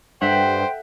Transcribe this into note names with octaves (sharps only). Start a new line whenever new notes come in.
G2 A4 C5 E5 F#5 G5